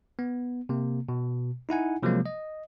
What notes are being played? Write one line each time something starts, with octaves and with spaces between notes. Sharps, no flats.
B3
C3 A#3
B2
D#4 E4 F#5 G#5
C3 F3 F#3 G#3 A#3
D#5